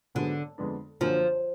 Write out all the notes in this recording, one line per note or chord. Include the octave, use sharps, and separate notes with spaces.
G#2 D3 F#3 B3 D4 G#4
F2 D3 G#3 B3 D4
F#2 D3 F3 F#3 A#3 D4